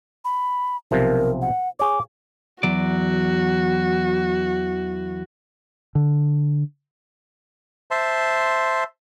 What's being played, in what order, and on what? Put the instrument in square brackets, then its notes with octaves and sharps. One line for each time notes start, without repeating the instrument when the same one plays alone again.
[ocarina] B5
[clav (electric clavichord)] B1 C3 F3 [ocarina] A#4
[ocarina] F#5
[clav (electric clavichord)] G#4 C#5 [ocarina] D6
[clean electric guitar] E2 F#3 D5 [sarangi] F#4
[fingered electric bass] D3
[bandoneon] C5 E5 A5 C6